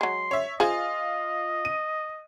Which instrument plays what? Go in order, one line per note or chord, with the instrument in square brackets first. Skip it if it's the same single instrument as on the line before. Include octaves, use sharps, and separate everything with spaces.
[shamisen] F#3 G#3 [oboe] C6
[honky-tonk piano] C#5 E5
[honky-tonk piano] F4 [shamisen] G#4 C5 [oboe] D#5
[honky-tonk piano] D#7